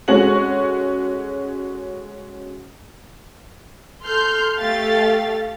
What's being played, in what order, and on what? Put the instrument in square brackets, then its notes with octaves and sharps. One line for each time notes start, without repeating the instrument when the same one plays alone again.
[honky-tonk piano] G#3 C#4 F#4 A4 F#5 F#7
[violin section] A4 C6 F6 G6
A3 G4 A4 F5 A6